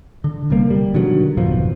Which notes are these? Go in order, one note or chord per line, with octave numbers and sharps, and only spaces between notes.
D3
E1 C3 G3 A#3
G3
B2 D3 D#3 F#3
G#1 F2 B2 F3